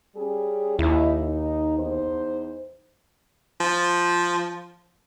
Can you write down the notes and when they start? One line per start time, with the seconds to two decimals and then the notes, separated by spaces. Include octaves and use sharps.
0.16 G3 C#4 G#4
0.79 D#2 D#4 E4
1.28 D#4
1.78 E2 D#4 C5
3.60 F3